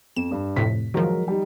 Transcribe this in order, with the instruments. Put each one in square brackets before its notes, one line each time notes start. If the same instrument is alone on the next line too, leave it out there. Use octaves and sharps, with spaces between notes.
[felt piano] F2 [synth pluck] E7
[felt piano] G2
[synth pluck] F2 A2 C3 [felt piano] B6
[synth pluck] D#3 F3 [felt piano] F#3 G#3 A#4
[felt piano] G3 D#4